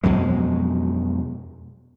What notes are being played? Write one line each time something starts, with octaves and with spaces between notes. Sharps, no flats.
F2 B2 F#3 G#3